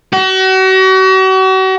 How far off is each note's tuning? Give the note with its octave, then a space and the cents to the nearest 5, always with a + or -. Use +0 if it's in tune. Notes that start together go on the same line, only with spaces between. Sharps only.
F#4 +40